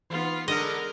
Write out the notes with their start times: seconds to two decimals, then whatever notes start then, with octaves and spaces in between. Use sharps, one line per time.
0.10 E3 B3 D#4 F4
0.48 D3 G#3 B3 A#4 D#5